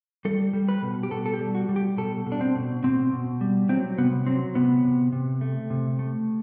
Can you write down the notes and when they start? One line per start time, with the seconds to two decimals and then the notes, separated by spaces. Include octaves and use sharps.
0.25 G3 A4
0.54 G3
0.69 B4
0.82 B2
1.03 G4
1.11 B2 A4
1.26 A4
1.34 G4
1.40 G3
1.55 F#4
1.69 G3
1.76 G4
1.98 B2 A4
2.26 B2
2.32 D4
2.41 C4
2.55 B2
2.84 B2 C4
3.13 B2
3.41 G3
3.69 F#3 C4
3.98 C3 B3
4.26 F#3 C4
4.55 C3 B3
4.84 C3
5.12 C3
5.41 A3
5.70 C3
5.99 A3